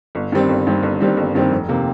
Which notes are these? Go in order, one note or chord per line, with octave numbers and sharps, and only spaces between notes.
G1
G2 D#3 G3 C4
G1
G2 D#3 G3 C4
G1
G2 D#3 G3 C4
G1
G2 D#3 G3 C4
F1
C3 D#3 A#3